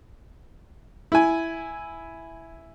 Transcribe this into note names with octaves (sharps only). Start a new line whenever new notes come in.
E4 G#5